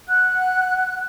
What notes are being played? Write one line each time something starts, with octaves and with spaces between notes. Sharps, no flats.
F#5 F#6